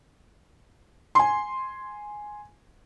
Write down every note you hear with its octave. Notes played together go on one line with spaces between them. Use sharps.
G#5 C6